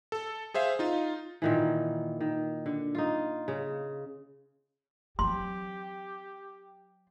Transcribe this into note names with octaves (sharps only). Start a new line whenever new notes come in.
A4
G#4 C5 E5 F5
D#4 F4
A#2 D#3 E3
D#3
D3
D#4 F4
C#3
F#3 C4 G4 C6